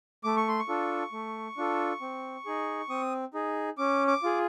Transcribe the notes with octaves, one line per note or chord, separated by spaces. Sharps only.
A3 D6
C#6
C6
C#6
D4 F4 A4
A3
D4 F4 A4
C4
D#4 G#4
C4 D#6
D#4 G#4
C#4 D6
D6
F4 G#4